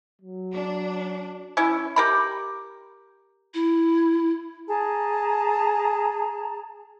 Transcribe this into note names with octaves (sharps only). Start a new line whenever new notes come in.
F#3
D4
C#4 E4
G4 A#4 B5
E4
G#4 A5 A#5